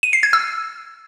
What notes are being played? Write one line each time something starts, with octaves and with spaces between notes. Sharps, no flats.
D#7
C7
G#6
E6